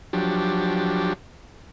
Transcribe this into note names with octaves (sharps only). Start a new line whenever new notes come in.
F3 F#3 D4 G4